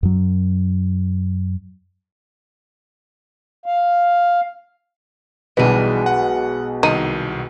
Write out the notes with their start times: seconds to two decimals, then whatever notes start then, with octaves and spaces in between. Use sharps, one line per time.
0.03 F#2 F#3
3.66 F5
5.57 B1 B2 E3 G3 G#3 G#4 B4
6.06 F#5
6.83 C2 D#3 D#4 D#7